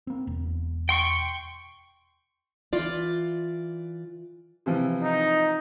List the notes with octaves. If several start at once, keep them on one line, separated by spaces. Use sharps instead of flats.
A#3 C4
E1
G5 C6 C#6
E3 F4 D5
C3 E3 F3
D#4